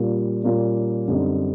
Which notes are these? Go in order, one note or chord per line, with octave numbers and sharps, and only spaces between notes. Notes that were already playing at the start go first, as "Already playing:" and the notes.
Already playing: A#2 G3 A#3 C#4 F4
A#2 G3 A#3 C#4 F4
F#2 D3 G3 C4 D#4